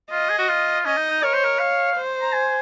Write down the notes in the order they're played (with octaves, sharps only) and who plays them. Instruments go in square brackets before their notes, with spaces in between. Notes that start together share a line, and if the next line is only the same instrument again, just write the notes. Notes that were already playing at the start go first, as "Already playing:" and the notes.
[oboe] F4 [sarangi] D#5
[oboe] G#4
F#4
F4
[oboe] C#4 [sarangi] D#5
[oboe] D#4
D#4
[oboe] A#4 [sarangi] C#5
[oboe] C5
A#4
F5
[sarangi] C5
[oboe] A#5
G#5